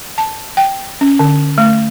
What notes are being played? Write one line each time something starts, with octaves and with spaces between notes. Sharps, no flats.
A5
G5
C#4
D3
A3